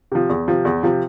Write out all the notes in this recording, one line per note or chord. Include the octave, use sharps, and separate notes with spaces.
C3 F3
E2
C3 F3
E2
C3 F3